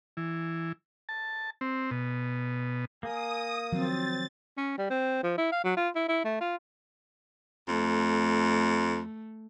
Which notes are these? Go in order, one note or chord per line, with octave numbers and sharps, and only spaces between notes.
E3
A5
C4
B2
A#3 G#5 D#6
D#3 F3 F#3 C4 A6
C#4
G3
C4
F3
E4
F5
F#3
F4
E4
E4
A3
F4
F2 A3